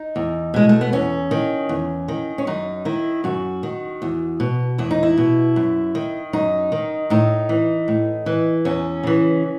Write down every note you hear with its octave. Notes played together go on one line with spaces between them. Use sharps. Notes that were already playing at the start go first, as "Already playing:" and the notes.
Already playing: D#4
E2
B2 G#3
A3
B3
E2 C#4
D#3
E2
D#3
C#4
F#2 D#4
D#3 E4
F#2 F#4
D#3
E2
B2
E2 E4
D#4
E4
B2
F#2
D#3
F#2 D#4
D#3
A2 D#4
E3
A2
E3
E2 C#4
C#3 E3